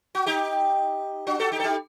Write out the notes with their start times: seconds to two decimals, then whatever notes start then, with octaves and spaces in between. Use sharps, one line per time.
0.15 F#4
0.26 D#4 G4
1.27 D4 F#4
1.39 F#4 A4
1.52 D#4 G4
1.60 A4
1.64 D#4 G4